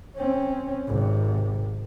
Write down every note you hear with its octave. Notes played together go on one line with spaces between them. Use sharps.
C4 C#4
G#1 C3